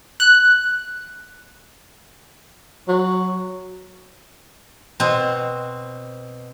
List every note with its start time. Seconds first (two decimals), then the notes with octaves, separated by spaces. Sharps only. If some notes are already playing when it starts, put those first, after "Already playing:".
0.20 F#6
2.88 F#3
5.00 B2 C4